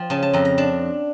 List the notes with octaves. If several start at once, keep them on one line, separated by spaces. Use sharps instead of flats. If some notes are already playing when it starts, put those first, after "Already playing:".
Already playing: F3 G5
C#3 A5
A5
F2 A#5
A#5
D4 A5